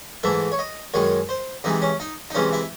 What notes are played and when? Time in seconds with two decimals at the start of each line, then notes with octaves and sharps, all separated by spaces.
0.23 G#2 E3 A3 E5
0.52 C#5
0.59 D#5
0.94 F#2 D#3 G#3 C#5
1.29 C5
1.64 C3 E3 G#3 D#4
1.82 C#4
2.00 D#4
2.31 D#4
2.35 C3 E3 G#3 C#4
2.53 E4